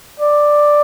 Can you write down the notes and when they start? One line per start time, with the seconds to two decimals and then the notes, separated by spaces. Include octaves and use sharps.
0.20 D5